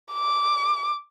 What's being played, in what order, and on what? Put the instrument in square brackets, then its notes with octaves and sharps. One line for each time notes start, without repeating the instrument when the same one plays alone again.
[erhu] D6